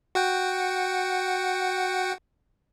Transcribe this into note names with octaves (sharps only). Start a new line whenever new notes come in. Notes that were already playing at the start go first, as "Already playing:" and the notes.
F#4 F#5 G5